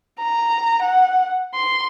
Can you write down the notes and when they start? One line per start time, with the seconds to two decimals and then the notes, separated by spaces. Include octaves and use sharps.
0.20 A#5
0.83 F#5
1.55 C6